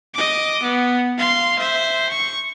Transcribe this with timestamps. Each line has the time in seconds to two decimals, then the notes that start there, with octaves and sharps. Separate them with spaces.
0.14 D#5 D6
0.63 B3
1.18 F5 C6
1.59 C5 E5
2.10 C#6